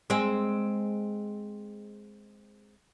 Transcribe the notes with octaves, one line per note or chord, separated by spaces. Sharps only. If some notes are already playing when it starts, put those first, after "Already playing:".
G#3 C4